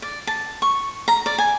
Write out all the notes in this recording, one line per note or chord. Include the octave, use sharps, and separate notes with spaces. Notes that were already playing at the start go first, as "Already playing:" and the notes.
D5
A5
C#6
A#5
D5
G#5